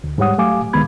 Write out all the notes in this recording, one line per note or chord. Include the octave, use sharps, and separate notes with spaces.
D2
G#2 G3 G4 C#5 F#5 D#6
F#3 A3 G4 F5 G#5 D6
C#2 D#3 G#3 B3 B5 G#6